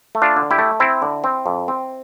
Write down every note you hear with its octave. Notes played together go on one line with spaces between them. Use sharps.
A3
D4 F4
D3
E4 G4
A3
C4 E4
D3
C4
F2
C4